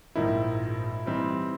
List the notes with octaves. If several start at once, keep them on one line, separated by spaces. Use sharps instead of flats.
A#1 G#2 F3 A#3 D#4 E4
E3 G3 C4 D#4